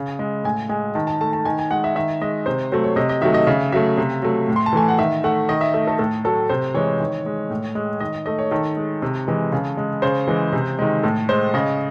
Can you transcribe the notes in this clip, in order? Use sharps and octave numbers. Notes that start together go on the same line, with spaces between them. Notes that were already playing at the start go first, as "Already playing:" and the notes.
Already playing: C#3
G#3
A2 G#5
G#3 G#5
D#3 A5
A5
A3 A5
A5
D#3 G#5
G#5
G#3 F#5
E5
D#3 E5
G#3 D#5
C3 C5
F#3 A3 C5
C#5
C3 D#5
D#5
D#3 F#3 A3 E5
D#5
C#3 E5
F#3 A3 E5
C3
F#3 A3
A2
C6
A5
E3 A3 G#5
F#5
D#3 E5
A3 F#5
D#3 D#5
E5
A3 E5
A4
A2 A4
F#3 A3 A4
C3 C5
E3 G#3 C#5
D#3
G#3
A2
G#3
D#3 D#5
A3 D#5
C#5
D#3 A4
G#3
C3
E3 G#3
C#3
G#3
C#3 C5
E3 G#3
C3
D#3 G#3
A2 A4
G#3 C5
C#3 D#5